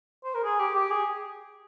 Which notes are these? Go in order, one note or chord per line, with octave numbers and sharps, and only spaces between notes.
C5
A#4
G#4
G4
G4
G#4